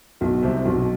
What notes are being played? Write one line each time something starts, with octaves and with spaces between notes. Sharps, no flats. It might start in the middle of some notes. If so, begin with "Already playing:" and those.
B1 B2
C2 C3
B1 B2